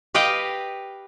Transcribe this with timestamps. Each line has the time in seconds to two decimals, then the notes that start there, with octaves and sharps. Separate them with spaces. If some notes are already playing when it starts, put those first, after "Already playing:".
0.14 G4 B4 D#5 F5 G5